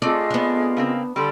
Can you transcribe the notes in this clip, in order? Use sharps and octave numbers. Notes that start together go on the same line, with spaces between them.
A3 C4 F4 G#4 A4 D5 D#5
B3 D4
C#3 A#3 C4
D3 G3 A4 B5 C6